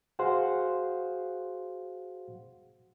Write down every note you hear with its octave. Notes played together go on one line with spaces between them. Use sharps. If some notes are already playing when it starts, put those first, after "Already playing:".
F#4 G#4 C5 F5 F#5 C6